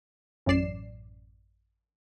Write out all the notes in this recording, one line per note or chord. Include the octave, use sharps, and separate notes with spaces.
A1 F#2 C#4 D5 C7 E7